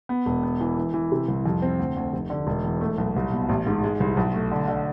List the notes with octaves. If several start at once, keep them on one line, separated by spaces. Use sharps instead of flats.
B3
E1
B3
E3
E3
E3
C3
C2
F2
C4
D2
D2
F1
D3
E1
E2
A3
B1
C2
B2
A1
G#2
G#3
C2
B1
A3
D3
D3